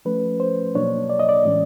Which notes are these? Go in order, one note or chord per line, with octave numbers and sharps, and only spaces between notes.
F3 A3 C#4 B4
C5
B2 F#3 A#3 D4 C#5
D5
D#5
D5
A2 E3 G#3 C#4